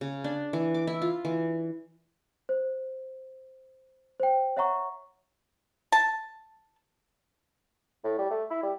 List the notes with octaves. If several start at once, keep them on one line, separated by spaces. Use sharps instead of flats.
C#3
D4
E3
D6
E4
F4
E3
C5
C5 G5
C#5 E5 F#5 A#5 C#6
A5
A2
G3
A3
E4
G3